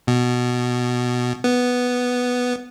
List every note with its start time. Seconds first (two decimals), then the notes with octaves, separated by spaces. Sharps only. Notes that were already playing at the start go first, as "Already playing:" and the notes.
0.07 B2
1.44 B3